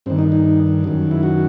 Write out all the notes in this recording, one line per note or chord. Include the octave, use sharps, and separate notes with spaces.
G2 D#3 C4
D#4
D#4
F#2 D#3
E4
F#4